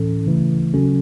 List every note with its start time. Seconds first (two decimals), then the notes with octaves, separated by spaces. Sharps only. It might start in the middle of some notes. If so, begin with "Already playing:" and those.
Already playing: A2 E3 C#4 A4
0.26 C#3 E3 A3
0.74 C#3 F#3 C#4 F#4 A4